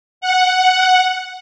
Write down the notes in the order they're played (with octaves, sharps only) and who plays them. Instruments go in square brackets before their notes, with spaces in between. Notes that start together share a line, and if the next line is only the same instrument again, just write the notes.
[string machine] F#5